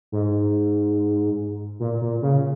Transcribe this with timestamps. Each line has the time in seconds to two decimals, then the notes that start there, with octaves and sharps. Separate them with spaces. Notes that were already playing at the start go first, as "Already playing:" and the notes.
0.12 G#2
1.80 A#2
2.01 A#2
2.22 C#3